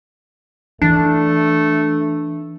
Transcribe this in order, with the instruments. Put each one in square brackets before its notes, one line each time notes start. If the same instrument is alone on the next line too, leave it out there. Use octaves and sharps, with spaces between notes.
[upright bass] E3 [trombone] A3 [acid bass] D4